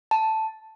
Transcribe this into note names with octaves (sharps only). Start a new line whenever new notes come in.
A5